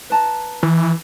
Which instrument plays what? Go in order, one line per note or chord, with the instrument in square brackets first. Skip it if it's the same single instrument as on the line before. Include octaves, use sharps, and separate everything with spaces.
[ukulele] B4 A5 A#5
[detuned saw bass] E3